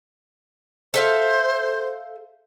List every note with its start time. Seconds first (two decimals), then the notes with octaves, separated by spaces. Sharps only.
0.94 A4 C5 E5 F5